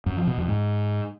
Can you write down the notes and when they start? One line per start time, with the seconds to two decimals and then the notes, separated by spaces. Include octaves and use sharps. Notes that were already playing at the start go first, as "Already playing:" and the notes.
0.06 F#2
0.17 F3
0.27 B2
0.38 F2
0.48 G#2